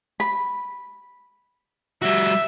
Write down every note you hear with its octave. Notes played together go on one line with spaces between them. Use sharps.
B5
G3 F#4 E5